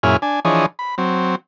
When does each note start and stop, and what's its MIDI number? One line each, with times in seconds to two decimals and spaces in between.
0.03 0.17 42
0.03 0.17 46
0.03 0.17 61
0.03 0.17 64
0.03 0.17 68
0.03 0.17 89
0.22 0.40 62
0.22 0.40 80
0.45 0.66 52
0.45 0.66 53
0.45 0.66 62
0.45 0.66 68
0.45 0.66 73
0.45 0.66 75
0.79 0.95 83
0.98 1.35 54
0.98 1.35 60